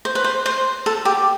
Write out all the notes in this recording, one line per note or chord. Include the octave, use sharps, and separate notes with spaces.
C5
B4
C5
C5
A4
G4